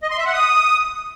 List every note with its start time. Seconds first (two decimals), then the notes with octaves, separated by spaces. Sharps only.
0.03 D#5
0.10 C6
0.18 E5
0.26 F#5
0.33 D#6